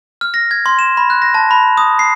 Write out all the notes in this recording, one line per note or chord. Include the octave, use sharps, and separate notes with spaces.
F6
A#6
G#6
C6
E7
B5
F#6
A#6
A5
B5
D#6
C7